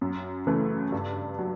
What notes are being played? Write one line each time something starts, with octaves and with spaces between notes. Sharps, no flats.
F#2
C#3 E3 A3
G2
F#3